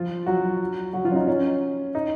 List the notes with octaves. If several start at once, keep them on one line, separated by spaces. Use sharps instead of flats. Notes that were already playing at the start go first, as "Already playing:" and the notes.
Already playing: F3 F4
F#3 F#4
F#3 F#4
F3 F4
C#4
D#4
C#4
D#4